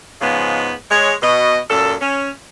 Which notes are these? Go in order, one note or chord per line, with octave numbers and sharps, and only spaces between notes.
G#2 C#3 F3 G#3 B3
G#3 C#5
B2 D#5
F#2 A#2 A4
C#4